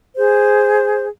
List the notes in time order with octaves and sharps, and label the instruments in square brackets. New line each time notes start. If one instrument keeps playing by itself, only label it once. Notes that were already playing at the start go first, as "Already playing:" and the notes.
[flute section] G#4 C5